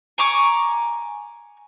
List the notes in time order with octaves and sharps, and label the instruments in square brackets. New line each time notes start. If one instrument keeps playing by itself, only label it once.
[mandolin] G#5 A#5 C#6 D6